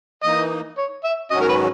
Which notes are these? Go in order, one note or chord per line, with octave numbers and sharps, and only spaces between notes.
E3 A#3 D#4 D#5
C#5
E5
G#2 D#3 F#3 C#4 F#4 D#5
A#4
B4